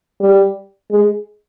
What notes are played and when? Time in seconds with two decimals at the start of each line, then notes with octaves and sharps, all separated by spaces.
0.20 G3
0.91 G#3